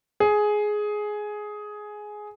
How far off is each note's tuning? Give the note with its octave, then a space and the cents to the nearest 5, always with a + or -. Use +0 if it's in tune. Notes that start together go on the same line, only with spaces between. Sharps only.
G#4 +10